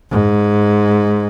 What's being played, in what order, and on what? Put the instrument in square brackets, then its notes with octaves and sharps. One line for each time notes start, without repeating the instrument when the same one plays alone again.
[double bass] G#2